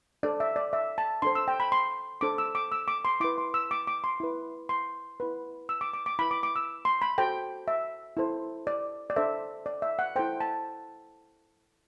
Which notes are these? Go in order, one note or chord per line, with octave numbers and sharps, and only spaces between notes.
D4 A4 C5 D5
E5
D5
E5
A5
D4 A4 C5 C6
E6
G5
B5
C6
D4 A4 C5 D6
E6
D6
E6
D6
C6
E4 B4 D6
C6
E6
D6
D6
C6
E4 B4
C6
E4 B4
E6
D6
D6
D6
E4 B4 B5
D6
D6
E6
C6
B5
F#4 A4 C5 G5
E5
E4 A4 C5
D5
D5
D4 A4 C5 E5
D5
E5
F#5
E4 A4 C5 G5
A5